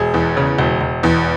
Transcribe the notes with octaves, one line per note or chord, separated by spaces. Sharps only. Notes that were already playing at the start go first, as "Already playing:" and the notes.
Already playing: E1 G#4
E2
C#3
E1
E1
E2